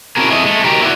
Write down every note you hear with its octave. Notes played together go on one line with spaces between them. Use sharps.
C#4 D4 E4 F#4 G#4 A#4
F2 A3 E4 G#4 D#5
G#3 A3
F#3 D#4 G4 A#4
E4 F#4 A4 D5 F#5